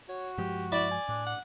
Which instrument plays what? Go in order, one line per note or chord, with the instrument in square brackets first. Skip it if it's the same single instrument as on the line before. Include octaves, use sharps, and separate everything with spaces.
[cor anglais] F#4 [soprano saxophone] C#5
[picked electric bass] G2 F3 G#3 [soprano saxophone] G4
[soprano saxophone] E4 [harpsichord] D5
[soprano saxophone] G#5
[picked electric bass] A2 [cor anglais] D4
[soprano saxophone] F#5